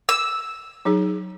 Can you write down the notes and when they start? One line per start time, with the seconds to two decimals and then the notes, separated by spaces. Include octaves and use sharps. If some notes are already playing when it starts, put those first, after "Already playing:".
0.09 E6
0.85 F#3 D#4 G#4